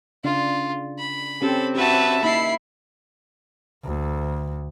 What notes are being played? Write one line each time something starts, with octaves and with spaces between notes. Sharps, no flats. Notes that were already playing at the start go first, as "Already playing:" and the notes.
C#3 D4 F4 D5
B5
C4 C#4 G4 A4 C5
F#4 G4 B4 E5 A5
A#3 D#4 E4 B5 C7
D2